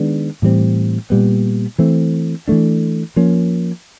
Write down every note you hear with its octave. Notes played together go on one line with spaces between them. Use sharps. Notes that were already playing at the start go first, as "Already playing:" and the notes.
Already playing: D#3 G#3 B3 D4
A2 E3 G3 C4
A#2 G3 B3
E3 A3 C4
E3 A3 D4
F3 A#3 C#4